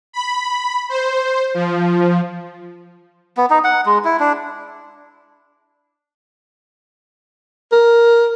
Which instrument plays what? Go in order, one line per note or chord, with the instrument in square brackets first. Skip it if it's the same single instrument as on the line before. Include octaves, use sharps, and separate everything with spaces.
[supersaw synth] B5
C5
F3
[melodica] B3
D#4
F#5
G#3
E4
D4
[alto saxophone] A#4